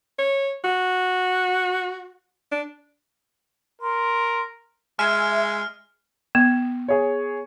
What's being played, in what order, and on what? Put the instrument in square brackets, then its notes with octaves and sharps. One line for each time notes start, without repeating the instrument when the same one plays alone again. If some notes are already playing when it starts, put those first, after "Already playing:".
[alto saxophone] C#5
F#4
D4
[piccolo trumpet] A#4 [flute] C6
[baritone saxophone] G#3 [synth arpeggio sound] E5 G#5 [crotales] F6
[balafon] B3
[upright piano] G#4 C#5